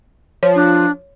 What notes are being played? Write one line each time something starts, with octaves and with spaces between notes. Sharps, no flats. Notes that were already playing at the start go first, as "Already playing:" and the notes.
F3 C#5
D4